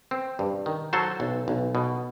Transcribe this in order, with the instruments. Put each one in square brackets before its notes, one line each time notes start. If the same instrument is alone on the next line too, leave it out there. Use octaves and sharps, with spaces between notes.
[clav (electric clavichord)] C4
G2
D#3
F#3 A4 C5
B1
B1
B2